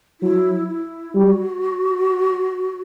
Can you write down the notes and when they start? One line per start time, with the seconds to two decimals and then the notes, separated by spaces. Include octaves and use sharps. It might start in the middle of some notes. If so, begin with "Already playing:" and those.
0.21 F#3 E4
0.68 E4
1.15 G3 F#4